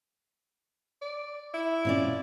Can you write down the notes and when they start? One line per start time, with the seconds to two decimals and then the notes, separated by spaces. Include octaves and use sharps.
1.02 D5
1.54 E4
1.85 A#2 C#4 D5